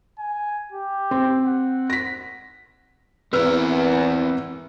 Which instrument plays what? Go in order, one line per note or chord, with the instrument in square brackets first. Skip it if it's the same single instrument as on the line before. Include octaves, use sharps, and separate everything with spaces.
[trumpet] G#5
G4
[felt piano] C4
[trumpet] F#5
[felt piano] A#6 B6
[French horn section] E2 [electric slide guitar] C4 A#4 [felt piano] B4 E6 F6